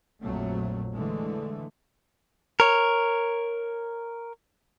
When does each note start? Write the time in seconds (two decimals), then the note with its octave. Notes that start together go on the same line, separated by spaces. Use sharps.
0.22 A#1 F2 A#2 F#3 A3
0.94 D3 E3 G#3 A3
2.60 A#4 C#5